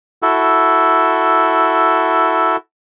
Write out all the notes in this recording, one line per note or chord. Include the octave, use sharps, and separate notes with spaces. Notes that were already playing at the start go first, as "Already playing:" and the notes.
E4 F#4 A4